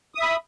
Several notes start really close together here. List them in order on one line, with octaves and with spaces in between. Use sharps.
D#6 E5 B5